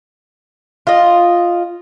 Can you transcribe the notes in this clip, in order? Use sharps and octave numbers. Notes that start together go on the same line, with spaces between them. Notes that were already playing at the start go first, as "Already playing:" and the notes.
F4 D#5